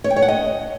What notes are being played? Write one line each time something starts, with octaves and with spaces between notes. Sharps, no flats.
C#5
G5
C#5
F#5
D#5